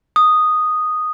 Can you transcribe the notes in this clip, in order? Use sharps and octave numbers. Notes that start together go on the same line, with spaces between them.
D#6